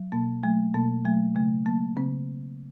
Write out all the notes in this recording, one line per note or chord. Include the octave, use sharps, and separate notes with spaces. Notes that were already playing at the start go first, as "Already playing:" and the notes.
Already playing: F#3
B2 A#3
F#3 A3
B2 A#3
F#3 A3
C#3 A3
F#3 A#3
C#3 C4